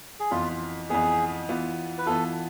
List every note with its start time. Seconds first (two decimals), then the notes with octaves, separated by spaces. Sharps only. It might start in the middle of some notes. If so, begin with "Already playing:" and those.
0.20 G#4
0.31 F2 E3 B3 F4
0.90 F2 E3 B3 G#4
1.49 E3 B3 F4
1.98 B4
2.06 E3 B3 F4 A4